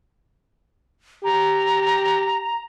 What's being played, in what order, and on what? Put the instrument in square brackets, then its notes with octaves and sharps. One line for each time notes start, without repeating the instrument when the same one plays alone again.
[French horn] G4 [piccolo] A#5